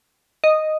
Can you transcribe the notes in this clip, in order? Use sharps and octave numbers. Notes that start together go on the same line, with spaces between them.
D#5